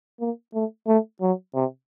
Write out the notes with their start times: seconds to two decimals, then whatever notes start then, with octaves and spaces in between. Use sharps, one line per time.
0.21 A#3
0.55 A3
0.88 A3
1.22 F#3
1.55 C3